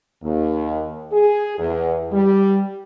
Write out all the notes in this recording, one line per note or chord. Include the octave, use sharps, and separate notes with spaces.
D#2
G#4
E2
G3